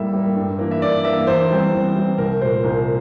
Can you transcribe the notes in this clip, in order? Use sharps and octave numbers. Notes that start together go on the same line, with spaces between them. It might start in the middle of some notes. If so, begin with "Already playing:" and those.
Already playing: A2 G3 A#3 E5
G3 A#3
G2
E3 A#3
E5
G2 D5
E3 A#3 E5
E2 C5
E3 G3 C4
E2
E3 G3 C4
C2 A#4
A#2 A3 C5
C2